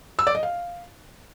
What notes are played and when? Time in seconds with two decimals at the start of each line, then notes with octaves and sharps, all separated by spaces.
0.19 E6
0.27 D5
0.35 D#5
0.43 F5